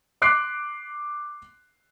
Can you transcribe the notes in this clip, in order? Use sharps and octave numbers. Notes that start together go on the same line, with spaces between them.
C6 D6 F#6 C7 D7